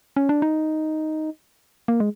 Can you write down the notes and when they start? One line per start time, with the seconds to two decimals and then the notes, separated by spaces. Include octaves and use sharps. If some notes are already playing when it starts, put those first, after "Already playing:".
0.16 C#4
0.29 D4
0.42 D#4
1.88 A#3
2.00 G#3